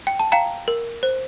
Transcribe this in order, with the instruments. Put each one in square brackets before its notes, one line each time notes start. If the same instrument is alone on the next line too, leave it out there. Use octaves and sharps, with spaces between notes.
[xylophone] G5
A5
F5 G5 A#5
A#4
C5